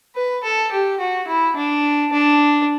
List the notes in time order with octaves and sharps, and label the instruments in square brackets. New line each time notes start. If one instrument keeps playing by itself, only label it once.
[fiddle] B4
A4
G4
F#4
E4
D4
D4